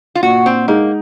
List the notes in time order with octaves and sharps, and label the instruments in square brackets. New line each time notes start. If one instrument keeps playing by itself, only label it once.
[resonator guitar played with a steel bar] F4
[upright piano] A#2 [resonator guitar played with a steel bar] F#4
[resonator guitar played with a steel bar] C4
[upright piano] G#3 D#4 [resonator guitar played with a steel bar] A#3